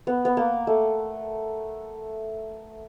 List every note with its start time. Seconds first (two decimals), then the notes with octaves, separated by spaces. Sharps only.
0.07 B3
0.25 B3
0.37 A#3
0.67 A3